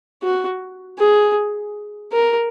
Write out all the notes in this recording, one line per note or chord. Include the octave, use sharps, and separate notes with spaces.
F#4
G#4
A#4